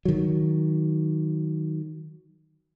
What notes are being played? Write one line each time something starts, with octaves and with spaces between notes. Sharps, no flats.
D#3 F#3